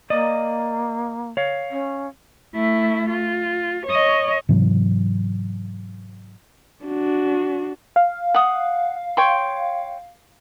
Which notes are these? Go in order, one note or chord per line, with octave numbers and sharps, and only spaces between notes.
A#3 D5 D#5
C#5 F5
C#4
A3 E4
F4
C#5 D#5
G#2 C3 E3 F#3
D4 F#4
F5
F#5 D#6
C#5 G5 C6